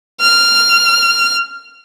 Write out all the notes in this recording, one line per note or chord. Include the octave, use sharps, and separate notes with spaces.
F6